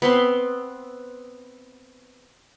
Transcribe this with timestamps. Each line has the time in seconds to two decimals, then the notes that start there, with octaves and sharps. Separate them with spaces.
0.02 B3 C4 C6